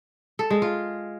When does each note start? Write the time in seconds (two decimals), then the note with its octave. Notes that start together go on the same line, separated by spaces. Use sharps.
0.39 A4
0.50 G#3
0.62 F4